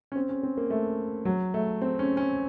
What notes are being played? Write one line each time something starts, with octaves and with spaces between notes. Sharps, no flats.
C#4
C4
C#4
C4
A#3
A3
F#3
A3
C4
C#4
C#4